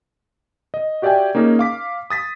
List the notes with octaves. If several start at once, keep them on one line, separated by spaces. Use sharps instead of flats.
D#5
F#4 G4 D5 E5 G5 G#5
A#3 C#4 D#4 G#4
F5 D6 B6
D#6 A6 B6